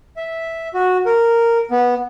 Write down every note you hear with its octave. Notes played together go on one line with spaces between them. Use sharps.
E5
F#4
A#4
B3